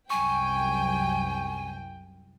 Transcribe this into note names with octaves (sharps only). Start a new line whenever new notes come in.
C2 F#2 G5 G#5 C#6